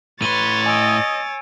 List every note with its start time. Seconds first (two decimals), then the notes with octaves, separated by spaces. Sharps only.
0.22 A2 B4 C#5 C6 A6 D#7
0.66 D#5 G#5 E6 D7